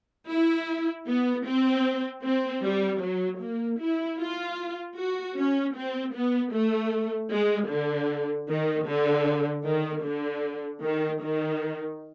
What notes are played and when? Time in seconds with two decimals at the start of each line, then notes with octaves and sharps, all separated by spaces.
0.29 E4
1.08 B3
1.46 C4
2.24 C4
2.64 G3
3.02 F#3
3.41 A#3
3.80 E4
4.20 F4
4.97 F#4
5.37 C#4
5.75 C4
6.14 B3
6.53 A3
7.31 G#3
7.70 D3
8.49 D#3
8.88 D3
9.66 D#3
10.05 D3
10.83 D#3
11.22 D#3